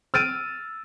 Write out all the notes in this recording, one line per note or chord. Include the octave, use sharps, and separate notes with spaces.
E6 F6 A6 D7 D#7